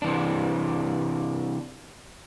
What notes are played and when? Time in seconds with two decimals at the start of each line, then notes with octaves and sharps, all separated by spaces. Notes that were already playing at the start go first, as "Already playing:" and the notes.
0.02 C3 E3 D4